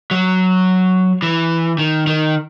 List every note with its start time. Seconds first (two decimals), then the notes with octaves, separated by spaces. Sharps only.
0.11 F#3
1.22 E3
1.78 D#3
2.07 D#3